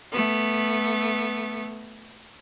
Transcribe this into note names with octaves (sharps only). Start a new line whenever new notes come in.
A3 B3